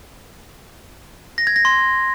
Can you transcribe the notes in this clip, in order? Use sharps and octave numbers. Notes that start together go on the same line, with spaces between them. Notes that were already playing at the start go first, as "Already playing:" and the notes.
A#6
G#6
A#6
C6